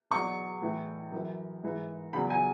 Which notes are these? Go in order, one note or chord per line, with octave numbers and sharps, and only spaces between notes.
E2 B2 F#3 C#6
A2 E3
F#2 E3
G#2 E3
E2 C#3 F#3 B5
G#5